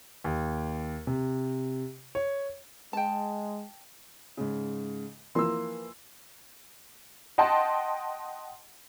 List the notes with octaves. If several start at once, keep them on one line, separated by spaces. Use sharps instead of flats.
D#2
C3
C#5
G#3 G5 A5
G#2 C#3
E3 F3 A#3 C6 E6
D#5 F#5 G5 A5 C6